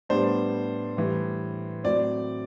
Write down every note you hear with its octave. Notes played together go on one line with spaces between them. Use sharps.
A2 G3 B3 D4 C5
A2 E3 G3
A2 F#3 C4 D5